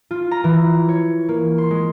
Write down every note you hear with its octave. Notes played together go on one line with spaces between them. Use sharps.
F4
A#5
E3
C#5
A#3
C6
G#3